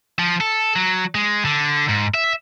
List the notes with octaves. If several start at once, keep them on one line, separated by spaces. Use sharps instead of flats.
F3
A4
F#3
G#3
D3
G#2
E5